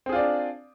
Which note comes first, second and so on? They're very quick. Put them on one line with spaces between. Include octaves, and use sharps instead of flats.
C4 G#4 F4 D5 D4